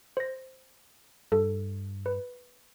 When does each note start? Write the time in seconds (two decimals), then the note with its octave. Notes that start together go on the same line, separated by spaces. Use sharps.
0.17 C5 A#6
1.32 G2 A4
2.06 B4